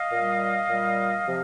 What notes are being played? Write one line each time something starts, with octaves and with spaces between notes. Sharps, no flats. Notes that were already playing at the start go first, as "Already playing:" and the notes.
Already playing: D#5 F5
A#2 G3
A#2 G3
C3 F3